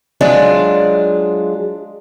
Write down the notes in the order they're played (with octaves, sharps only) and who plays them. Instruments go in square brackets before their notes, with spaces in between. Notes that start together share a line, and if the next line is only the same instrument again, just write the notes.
[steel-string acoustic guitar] F#3 G#3 D4 F4